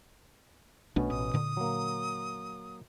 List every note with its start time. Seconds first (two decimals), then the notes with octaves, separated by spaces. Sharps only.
0.96 B1 B2 A3 B3 C#4 D4
1.10 A1 D#6
1.34 A#2 D3
1.57 F#3 A#3